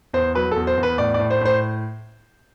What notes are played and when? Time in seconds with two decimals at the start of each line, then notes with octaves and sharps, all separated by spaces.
0.13 E2 C5
0.35 F#3 B4
0.51 E2 A4
0.67 C5
0.77 E2
0.83 B4
0.98 A2 D5
1.14 D5
1.20 A2
1.31 C5
1.41 A2 C5